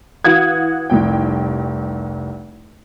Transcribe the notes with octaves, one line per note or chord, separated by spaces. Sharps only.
E3 F#4 F5 F#5 D#6 G#6
F1 C2 G5